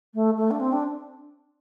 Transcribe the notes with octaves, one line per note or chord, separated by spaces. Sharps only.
A3
A3
D4
C4
D4